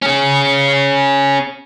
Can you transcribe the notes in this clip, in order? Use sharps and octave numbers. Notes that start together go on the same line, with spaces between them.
C#4 G#4